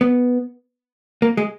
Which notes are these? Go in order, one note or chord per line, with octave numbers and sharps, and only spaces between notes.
B3
A#3
G#3